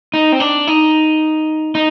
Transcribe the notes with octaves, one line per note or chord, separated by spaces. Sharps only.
D#4
C4
D4
D#4
D#4